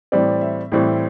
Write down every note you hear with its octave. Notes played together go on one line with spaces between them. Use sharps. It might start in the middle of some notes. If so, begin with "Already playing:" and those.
A2 E3 G3 C4 D5
E5
A2 E3 G3 C4